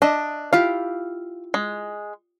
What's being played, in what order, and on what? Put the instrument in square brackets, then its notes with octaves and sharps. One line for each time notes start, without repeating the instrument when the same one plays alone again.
[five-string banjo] D4 [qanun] D#5 E5
[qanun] E4 F4 G4 [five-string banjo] F5
[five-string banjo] G#3